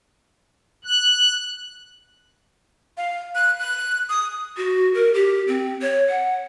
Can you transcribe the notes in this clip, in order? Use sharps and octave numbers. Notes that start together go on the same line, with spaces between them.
F#6
F5
F#6
F#6
D#6
F#4
A#4
G4
C4
C#5
F#5